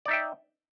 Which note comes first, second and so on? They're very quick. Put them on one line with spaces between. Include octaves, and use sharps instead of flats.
D5 D#4 E5 G5